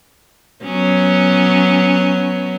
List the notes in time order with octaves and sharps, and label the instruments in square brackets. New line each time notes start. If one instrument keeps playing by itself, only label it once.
[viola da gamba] F#3 B3 C#4